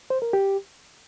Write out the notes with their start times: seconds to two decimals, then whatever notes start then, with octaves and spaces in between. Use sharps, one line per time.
0.10 C5
0.22 A#4
0.33 G4